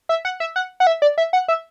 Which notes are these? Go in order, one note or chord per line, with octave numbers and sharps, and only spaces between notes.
E5
F#5
E5
F#5
F#5
E5
D5
E5
F#5
E5